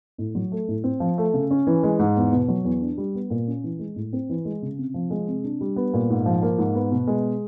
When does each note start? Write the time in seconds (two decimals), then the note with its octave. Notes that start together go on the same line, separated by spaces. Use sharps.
0.18 A2
0.35 F#3
0.52 A3
0.68 A2
0.84 C4
1.00 F3
1.18 A3
1.34 C#3
1.51 C#4
1.67 E3
1.83 G#3
1.99 G#2
2.16 E2
2.32 B2
2.48 F#3
2.64 E2
2.81 D4
2.98 G3
3.15 B3
3.30 A#2
3.48 C#4
3.64 E3
3.79 G#3
3.96 A2
4.13 C4
4.29 E3
4.45 G#3
4.62 C#3
4.78 C3
4.94 F3
5.10 G#3
5.28 C3
5.44 D4
5.61 G3
5.76 B3
5.94 A#2
6.10 G#2
6.26 F3
6.42 A#3
6.58 G#2
6.75 B3
6.91 B2
7.07 G#3